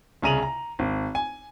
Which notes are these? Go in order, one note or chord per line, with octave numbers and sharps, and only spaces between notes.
C2 C#3 A#5 D#7 F7 F#7
A#5
G#1
G#5